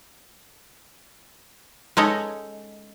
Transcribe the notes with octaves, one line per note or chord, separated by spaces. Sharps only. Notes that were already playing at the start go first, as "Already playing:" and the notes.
G#3 C#4 D#4 A4 C#5 D#5